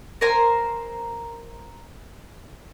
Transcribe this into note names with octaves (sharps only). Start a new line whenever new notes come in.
A#4 C5 G#5 A#5